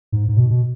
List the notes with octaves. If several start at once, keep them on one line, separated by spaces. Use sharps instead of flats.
G#2
G#2
B2
B2